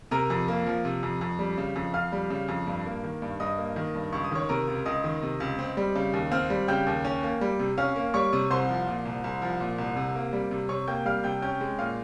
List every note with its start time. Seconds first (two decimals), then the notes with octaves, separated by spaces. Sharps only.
0.11 C3 A#4 A#5
0.30 F2
0.48 A#3
0.67 F3
0.85 C3
1.03 F2
1.21 F2
1.39 G3
1.58 C#3
1.76 F2
1.94 F2 F5 F6
2.12 G3
2.30 C#3
2.48 F2
2.67 G2
2.85 A#3
3.04 D#3
3.22 G2
3.40 G2 D#5 D#6
3.58 A#3
3.76 D#3
3.95 G2
4.13 C#2 C#6
4.24 D#6
4.31 D#3 C#5 C#6
4.49 C3 A#4 A#5
4.68 C#2
4.86 C#2 D#5 D#6
5.04 D#3
5.22 C3
5.40 C#2
5.59 C4
5.77 G3
5.96 C#3
6.13 D#2
6.31 C4 F5 F6
6.50 G3
6.68 C#3 G5 G6
6.87 D#2
7.05 C#4
7.23 A#3
7.41 G3
7.59 C3
7.78 C#4 F5 F6
7.96 A#3
8.14 G3 C#5 C#6
8.33 C3
8.51 C2 C5 C6
8.69 F3
8.87 A#2
9.05 C2
9.24 C2
9.42 F3
9.60 A#2
9.78 C2
9.96 C3
10.15 A#3
10.33 G3
10.51 C3
10.69 C3 C#5 C#6
10.88 A#3 G5 G6
11.05 G3 F5 F6
11.24 C3 G5 G6
11.42 C#4 G5 G6
11.61 G#3
11.79 A#2 F5 F6